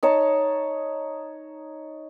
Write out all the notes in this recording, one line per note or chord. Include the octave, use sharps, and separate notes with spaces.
D#4 C#5 A5